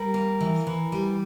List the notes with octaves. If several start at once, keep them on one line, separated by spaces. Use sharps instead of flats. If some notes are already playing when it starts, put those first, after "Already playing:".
Already playing: G3 A#4
A#3
E3
E3
G3